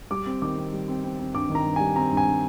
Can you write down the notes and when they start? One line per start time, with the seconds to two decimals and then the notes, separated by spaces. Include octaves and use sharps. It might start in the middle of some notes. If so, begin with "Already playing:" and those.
0.11 G3 D6
0.26 C4
0.42 D#3 D6
0.58 C4
0.73 G3
0.88 C4
1.04 C4
1.19 C4
1.34 G2 D6
1.50 D#3
1.55 A#5
1.65 G2
1.76 G#5
1.80 G3
1.96 C4 A#5
2.12 G2
2.17 G#5
2.28 G3